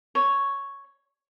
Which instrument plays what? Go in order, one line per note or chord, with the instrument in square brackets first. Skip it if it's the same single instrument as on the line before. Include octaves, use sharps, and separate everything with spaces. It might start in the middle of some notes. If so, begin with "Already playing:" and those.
[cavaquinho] C#5